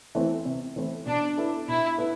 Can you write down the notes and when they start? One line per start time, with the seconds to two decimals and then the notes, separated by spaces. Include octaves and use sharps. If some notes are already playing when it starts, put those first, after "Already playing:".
0.15 E3 A3 C4 E4
0.45 C3
0.76 E3 A3 C4 E4
1.06 B2 D4
1.38 B3 E4 A4
1.68 B2 E4
1.98 B3 E4 A4